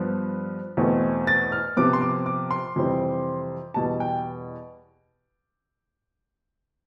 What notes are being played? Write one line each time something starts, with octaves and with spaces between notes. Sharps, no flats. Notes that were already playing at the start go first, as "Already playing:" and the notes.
Already playing: G2 F3 B3
E2 B2 A3 C4
A6
F6
C3 F3 B3 D6
C6
D6
D6
C6
F2 C3 E3 G3 C4
E2 B2 G3 A5
G5